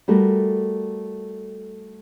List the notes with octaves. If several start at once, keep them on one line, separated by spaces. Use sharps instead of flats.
G3 A3 F#4 A#4